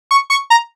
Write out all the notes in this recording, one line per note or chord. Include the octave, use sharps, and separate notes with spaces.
C#6
C#6
A#5